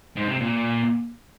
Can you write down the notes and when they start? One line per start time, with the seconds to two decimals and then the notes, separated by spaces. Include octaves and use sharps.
0.17 G#2
0.28 C3
0.40 A#2